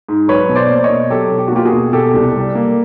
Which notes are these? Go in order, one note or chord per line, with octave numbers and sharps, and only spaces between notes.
G#2
F#3 B4 C#5
B2
C5 D5
A#3
D5
C#5 D#5
B2
F#3 G4 A4
B2
G4
F#4
A#3 F4 G4
F#4 G#4
B2
B2 G4 A4
C2
G3
A#3